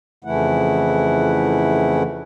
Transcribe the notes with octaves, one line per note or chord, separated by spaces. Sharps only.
F2 C#3 E3 A3 E4 F#5